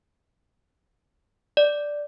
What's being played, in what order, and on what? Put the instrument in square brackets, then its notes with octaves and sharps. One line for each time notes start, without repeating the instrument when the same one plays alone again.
[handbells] D5